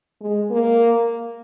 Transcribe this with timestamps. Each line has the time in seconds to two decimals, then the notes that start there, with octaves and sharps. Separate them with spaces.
0.21 G#3
0.50 A#3